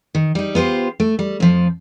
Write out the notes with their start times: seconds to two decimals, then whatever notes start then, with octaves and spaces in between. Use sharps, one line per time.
0.15 D#3
0.35 G3 D#4
0.55 B3 F4 G4 C5
1.00 A3
1.19 G3
1.40 F2 F3